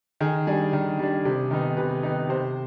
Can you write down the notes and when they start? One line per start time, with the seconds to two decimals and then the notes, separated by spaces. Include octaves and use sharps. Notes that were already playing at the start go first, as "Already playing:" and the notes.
0.20 D#3 G#4
0.47 G3 D4 G#4
0.73 D#3
0.99 G3 D4
1.25 C3
1.51 D#3 B3 D#4
1.77 C3 B4
2.03 D#3 B3 D#4
2.29 C3 C5